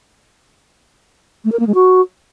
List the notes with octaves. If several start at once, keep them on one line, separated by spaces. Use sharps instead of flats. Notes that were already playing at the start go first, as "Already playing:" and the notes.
A3
A#4
A#3
G#3
F#4